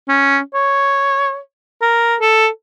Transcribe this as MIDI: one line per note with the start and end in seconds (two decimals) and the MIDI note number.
0.08 0.39 61
0.54 1.38 73
1.82 2.16 70
2.21 2.48 69